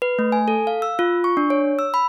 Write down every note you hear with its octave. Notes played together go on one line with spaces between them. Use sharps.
B4
A3
G#5
A4
F5
E6
F4
C#6
D4
C#5
E6
B5